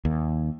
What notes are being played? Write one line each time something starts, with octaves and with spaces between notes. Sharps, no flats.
D#2